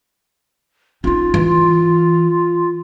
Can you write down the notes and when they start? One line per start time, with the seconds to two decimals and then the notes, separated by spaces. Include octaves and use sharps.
1.04 C#4 D#4 F4
1.34 E3